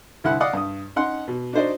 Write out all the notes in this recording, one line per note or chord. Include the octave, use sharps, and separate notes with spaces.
C2 D3 E4 F#5 F#6
D5 D#5 F5 F#5 D6 D#6
G2 D#6
C#4 D#4 F#5 C6
B2
D4 D#4 F#4 C5 D5 D#5